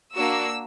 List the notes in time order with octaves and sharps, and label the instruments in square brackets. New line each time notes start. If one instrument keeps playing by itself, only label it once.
[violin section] A#3 D4 F#4 E6